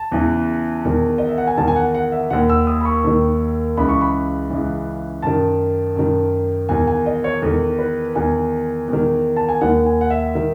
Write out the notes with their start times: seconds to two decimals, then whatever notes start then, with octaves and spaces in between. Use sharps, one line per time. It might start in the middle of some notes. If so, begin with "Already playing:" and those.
Already playing: A5
0.12 E2 C#3 E3
0.85 E2 D#3
1.18 D#5
1.28 E5
1.38 F#5
1.47 G#5
1.58 E2 D#3 A5
1.68 G#5
1.76 F#5
1.95 F#5
2.12 E5
2.30 D#2 D#3 F#5
2.49 E6
2.67 D#6
2.81 B5
2.85 C#6
3.04 D#2 D#3
3.77 C#2 C#3 E3 B5
3.89 C#6
4.01 B5
4.50 C#2 C#3 E3
5.22 F#2 D#3 A5
5.96 F#2 D#3
6.69 E2 D#3 G#5
6.87 G#5
7.06 D#5
7.24 C#5
7.42 E2 D#3 A4
7.79 B4
8.15 E2 D#3 G#5
8.88 E2 D#3
9.36 A5
9.49 G#5
9.61 D#2 D#3 F#5
9.86 G#5
10.01 F#5
10.10 E5
10.35 D#3